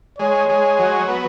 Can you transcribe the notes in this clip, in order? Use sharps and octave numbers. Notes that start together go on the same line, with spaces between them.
G#3 C#5
G#3
F#3
B3